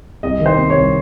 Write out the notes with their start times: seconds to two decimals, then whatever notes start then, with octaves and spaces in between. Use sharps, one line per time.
0.23 C2 D#5
0.40 D#3
0.46 C5
0.58 C3
0.70 C#5
0.76 C2